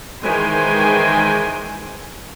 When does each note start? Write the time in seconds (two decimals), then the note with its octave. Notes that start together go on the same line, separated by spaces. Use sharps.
0.22 D#3 E3 G#3 C5 G5 G#5